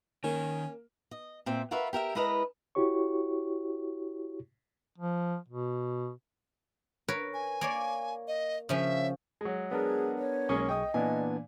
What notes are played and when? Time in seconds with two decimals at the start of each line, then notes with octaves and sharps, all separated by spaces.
0.24 D#3 A#3 C#4
1.11 D#5
1.46 A#2 C4 E5
1.71 F4 F#4 A#4 B4 E5
1.93 G4 A#4 E5 G5
2.15 G#3 E4 A#4 B4 D#5 A#5
2.75 E4 F#4 G4 C#5 C#6
4.98 F3
5.48 B2
7.08 A#4 B4 C#5
7.34 G#5
7.61 A#3 C#5 D5
8.27 D#5
8.69 C#3 F3 C#4 E5
9.41 F#3 G#3
9.71 B3 D4 G#4 A#4
10.18 C#5
10.49 B1 G#3 A#3 C#4 G#4 C#6
10.69 D#5 G5 D#6
10.94 A#2 E3 B3 D4 G#5